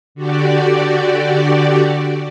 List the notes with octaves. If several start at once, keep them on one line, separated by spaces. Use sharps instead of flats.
D3 F#4 G4 D5